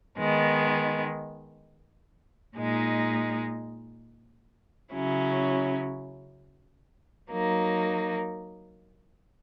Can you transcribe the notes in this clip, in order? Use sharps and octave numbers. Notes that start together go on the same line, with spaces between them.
D#3 G#3 B3
A#2 G#3 D#4
C#3 F#3 C#4 E4
F#3 A#3 D#4